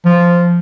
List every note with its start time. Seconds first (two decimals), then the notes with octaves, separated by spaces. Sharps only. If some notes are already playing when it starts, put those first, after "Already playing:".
0.05 F3